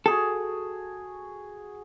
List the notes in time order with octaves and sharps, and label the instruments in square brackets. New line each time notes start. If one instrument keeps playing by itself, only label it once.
[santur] F#4 G#4 G5 [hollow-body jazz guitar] A4